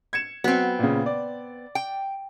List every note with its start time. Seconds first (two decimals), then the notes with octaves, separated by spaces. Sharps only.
0.13 G#6 C#7 E7
0.44 F#3 B3 C4
0.79 A#2 C#3
1.06 D5
1.75 G5